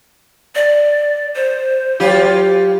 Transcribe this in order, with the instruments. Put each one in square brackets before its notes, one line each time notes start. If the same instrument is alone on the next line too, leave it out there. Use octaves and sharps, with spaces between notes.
[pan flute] D5
C5
[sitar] F#3 F4 G4